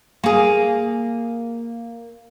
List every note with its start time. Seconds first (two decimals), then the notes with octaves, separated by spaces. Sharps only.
0.24 A#3 G#4